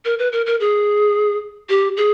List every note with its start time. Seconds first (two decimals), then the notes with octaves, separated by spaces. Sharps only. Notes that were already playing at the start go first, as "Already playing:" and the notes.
0.05 A#4
0.19 B4
0.32 A#4
0.46 A#4
0.60 G#4
1.69 G4
1.97 G#4